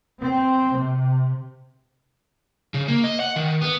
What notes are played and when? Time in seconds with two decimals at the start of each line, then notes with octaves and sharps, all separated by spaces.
0.20 C4
0.74 C3
2.74 C#3
2.88 A#3
3.04 D#5
3.20 F#5
3.36 D#3
3.61 B3